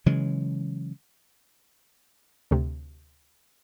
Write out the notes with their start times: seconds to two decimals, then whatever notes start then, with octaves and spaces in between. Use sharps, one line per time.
0.06 C#3 E3 F#3 G#3
2.51 D2 C3